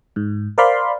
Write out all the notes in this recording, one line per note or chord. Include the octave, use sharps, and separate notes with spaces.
G#2
A#4 C5 D5 F5 B5 C6